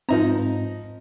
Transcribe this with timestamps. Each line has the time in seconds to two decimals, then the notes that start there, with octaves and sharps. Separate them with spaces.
0.09 G#2 F3 C4 D#4 A#5